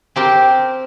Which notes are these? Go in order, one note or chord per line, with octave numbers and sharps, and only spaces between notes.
C4 G4 A#4